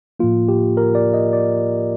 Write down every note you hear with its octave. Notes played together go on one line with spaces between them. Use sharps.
A2 F3 A#3 F4
G4
A#4
D5
D#5
D5